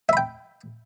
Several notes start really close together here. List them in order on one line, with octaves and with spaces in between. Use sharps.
E5 B5 G5